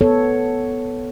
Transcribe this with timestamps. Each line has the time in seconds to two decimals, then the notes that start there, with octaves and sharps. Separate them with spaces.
0.01 B3 A4 C#5